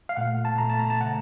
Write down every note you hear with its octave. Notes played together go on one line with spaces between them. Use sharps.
F5
A#2 A3 F#5
A5
A#2 A3 A#5
A5
A#5
A5
C#3 A3 F#5